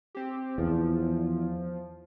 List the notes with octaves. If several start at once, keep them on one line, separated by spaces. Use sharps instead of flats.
C4 G4
E2 F3